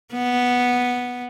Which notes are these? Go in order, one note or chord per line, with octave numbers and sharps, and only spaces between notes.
B3